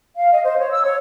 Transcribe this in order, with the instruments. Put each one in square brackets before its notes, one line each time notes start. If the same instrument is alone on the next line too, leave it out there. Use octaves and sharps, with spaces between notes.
[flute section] F5
D#5
C5
C#5
E6
C#5